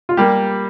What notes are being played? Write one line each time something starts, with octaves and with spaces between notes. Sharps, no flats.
F4
G3 A#3 G4